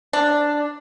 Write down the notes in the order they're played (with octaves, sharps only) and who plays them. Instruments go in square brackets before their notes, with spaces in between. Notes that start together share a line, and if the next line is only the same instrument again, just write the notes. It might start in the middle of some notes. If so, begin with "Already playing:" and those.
[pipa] D4